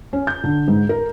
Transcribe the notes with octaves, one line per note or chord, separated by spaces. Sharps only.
C#4
G6
D3
G#2
A#4